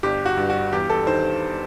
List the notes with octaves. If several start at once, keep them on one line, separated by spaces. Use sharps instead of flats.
G1 G4
F#4
G2
F#4
E2 G4
A4
D#3 C5